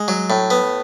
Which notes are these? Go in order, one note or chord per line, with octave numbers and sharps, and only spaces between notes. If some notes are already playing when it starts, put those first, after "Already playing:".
Already playing: G#3
F#3
A2
B3